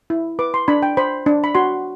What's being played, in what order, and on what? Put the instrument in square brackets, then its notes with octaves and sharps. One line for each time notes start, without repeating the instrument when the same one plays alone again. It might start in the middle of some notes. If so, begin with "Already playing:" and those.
[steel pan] E4
B4 D6
C6
D4 B5
G5
C5 B5
D4
B5
F#4 C6